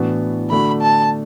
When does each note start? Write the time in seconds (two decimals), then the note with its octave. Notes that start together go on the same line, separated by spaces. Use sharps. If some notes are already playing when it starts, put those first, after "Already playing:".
Already playing: A2 E3 B3 D4 F#4
0.50 D3 A3 D4 F#4 B5
0.81 A5